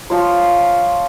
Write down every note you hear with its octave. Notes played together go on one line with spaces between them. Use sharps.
F3 F4 C#5 C6